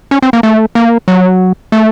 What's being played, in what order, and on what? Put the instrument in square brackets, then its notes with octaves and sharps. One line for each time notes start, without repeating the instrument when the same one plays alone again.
[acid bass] C#4
C4
A#3
A3
A#3
F#3
A3